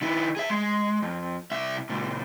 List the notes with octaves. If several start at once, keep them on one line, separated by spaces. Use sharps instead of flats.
D#3 E4
G#4 E5
G#3
F2
C2 E5
C#2 A#2